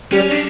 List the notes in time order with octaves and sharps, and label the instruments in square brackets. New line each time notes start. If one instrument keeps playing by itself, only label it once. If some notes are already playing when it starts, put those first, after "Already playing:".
[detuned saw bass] G3 [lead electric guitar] C#4
[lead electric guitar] D4